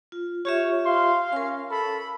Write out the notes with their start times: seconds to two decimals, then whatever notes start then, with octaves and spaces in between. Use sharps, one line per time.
0.12 F4
0.45 F4 G4 C#5 E5
0.86 F5 C6
1.33 C#4 A#4 C#6
1.71 A4 B5